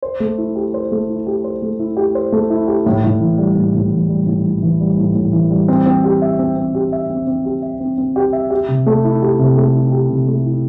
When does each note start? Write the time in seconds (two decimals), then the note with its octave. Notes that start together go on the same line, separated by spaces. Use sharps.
0.02 C5
0.20 A3
0.38 E4
0.56 G4
0.74 C5
0.92 A3
1.09 E4
1.27 G4
1.44 C5
1.62 A3
1.79 E4
1.97 G4
2.15 C5
2.32 A3
2.50 E4
2.68 G4
2.86 A2
3.04 A2
3.21 E3
3.38 G3
3.56 A2
3.74 A2
3.92 E3
4.09 G3
4.27 A2
4.45 A2
4.62 E3
4.80 G3
4.98 A2
5.15 A2
5.33 E3
5.51 G3
5.68 C4
5.86 C4
6.04 G4
6.22 E5
6.39 C4
6.56 C4
6.75 G4
6.92 E5
7.10 C4
7.27 C4
7.45 G4
7.62 E5
7.80 C4
7.98 C4
8.16 G4
8.33 E5
8.50 G4
8.68 C3
8.86 A3
9.04 E4
9.22 G4
9.39 C3
9.58 A3
9.74 E4
9.92 G4
10.10 C3
10.28 A3
10.46 E4